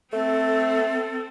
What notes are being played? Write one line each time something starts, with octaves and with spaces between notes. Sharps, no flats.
A3 C4 A4